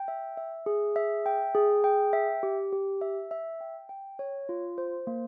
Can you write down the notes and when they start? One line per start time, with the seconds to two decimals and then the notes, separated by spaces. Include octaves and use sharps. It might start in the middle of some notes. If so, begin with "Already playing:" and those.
Already playing: G5
0.08 E5
0.37 E5
0.66 G#4
0.96 E5
1.26 G5
1.55 G#4
1.84 G5
2.13 E5
2.43 G4
2.72 G4
3.01 E5
3.31 E5
3.61 G5
3.89 G5
4.19 C#5
4.49 F4
4.78 C5
5.07 A#3